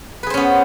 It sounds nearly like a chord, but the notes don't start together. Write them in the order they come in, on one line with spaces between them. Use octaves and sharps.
B4 G#4 C5 C#4 B3